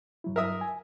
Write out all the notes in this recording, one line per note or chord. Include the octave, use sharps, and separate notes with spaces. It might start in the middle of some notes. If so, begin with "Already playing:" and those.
G2 F#3 E4
A#4 E5 D#6
G#5